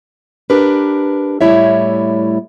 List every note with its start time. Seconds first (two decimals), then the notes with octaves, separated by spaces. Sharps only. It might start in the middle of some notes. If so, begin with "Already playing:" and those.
0.50 D4 G4 A#4 B4
1.41 A2 G3 A3 E4 C#5 E5